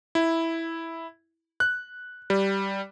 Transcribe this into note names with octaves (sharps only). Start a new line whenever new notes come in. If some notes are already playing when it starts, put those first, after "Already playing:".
E4
F#6
G3